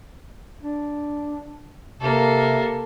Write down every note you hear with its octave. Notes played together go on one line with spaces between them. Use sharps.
D4
C3 A#3 A4